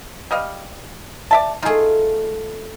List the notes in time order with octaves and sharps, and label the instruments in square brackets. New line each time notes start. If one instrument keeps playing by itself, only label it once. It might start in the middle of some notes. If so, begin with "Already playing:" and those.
[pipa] G3 D#5 F5
D5 E5 A5
[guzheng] A3 F4 [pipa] D#4 G#4